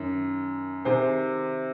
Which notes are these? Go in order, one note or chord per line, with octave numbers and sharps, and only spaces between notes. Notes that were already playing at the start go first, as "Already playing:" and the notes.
Already playing: F#2 D#3
C3 D#3 G#4 C5